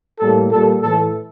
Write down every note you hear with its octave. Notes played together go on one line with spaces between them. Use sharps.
A2 G3 A#3 A4
A#2 G3 A#3 A4
A2 E3 A3 A4